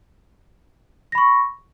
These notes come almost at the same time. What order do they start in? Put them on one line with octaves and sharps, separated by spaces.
A#6 B5 C#6